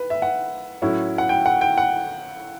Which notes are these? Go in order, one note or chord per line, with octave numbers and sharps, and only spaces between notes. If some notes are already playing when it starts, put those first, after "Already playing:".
Already playing: B4
E5
F#5
A2 F#3 C#4 E4
F#5
G5
F#5
G5
F#5